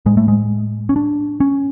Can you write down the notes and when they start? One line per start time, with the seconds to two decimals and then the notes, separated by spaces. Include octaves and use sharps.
0.06 A2 G#3
0.17 A3
0.28 G#3
0.89 C#4
0.96 D4
1.40 C#4